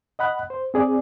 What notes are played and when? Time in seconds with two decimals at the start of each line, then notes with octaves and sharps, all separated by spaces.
0.19 D#5 F#5 B5 F#6
0.50 C5
0.74 C4 G#4 D5